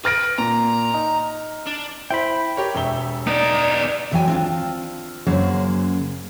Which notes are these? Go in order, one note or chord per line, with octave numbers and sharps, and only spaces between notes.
B4 F6 A#6 D7
A#2 A#5
D#4
D4
E4 C5 G5 B5
G4 A#4 C#5
E1 E5 G7
B3 D#4 D5
D#2 E3 F#3 D#5 G5 G#5
C4 D4 F4
F#2 C#3 F#3 A#3 G#4 C5